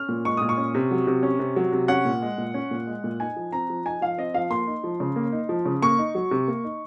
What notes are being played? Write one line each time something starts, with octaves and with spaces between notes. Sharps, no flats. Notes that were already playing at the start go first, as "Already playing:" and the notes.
Already playing: C#4 F6
A#2
G#3 C#6
A#2 D#6
C#6
C#4
C3
F#3
C3
C#4
C3
F#3
C3
C#4 F#5
A#2
G#3
A#2
C#4
A#2
G#3
A#2
D#4 G#5
F3
C4 A#5
F3
D#4 G#5
F3 F5
C4 D#5
F3 F5
A#3 C6
D#4
F3
C#3
A#3
D#4
F3
C#3
A#3 C#6
D#4
F#3
C3
A#3
D#4